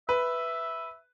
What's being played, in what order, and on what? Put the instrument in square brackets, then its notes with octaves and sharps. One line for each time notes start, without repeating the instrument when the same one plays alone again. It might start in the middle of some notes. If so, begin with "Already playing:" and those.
[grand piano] B4 [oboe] E5